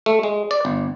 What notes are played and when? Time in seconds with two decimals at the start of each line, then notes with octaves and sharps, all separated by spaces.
0.06 A3
0.23 G#3
0.51 D5
0.65 G1